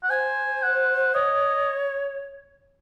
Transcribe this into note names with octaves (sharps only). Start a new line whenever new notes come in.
F#5
C5 G#5
F#5
C#5 D#5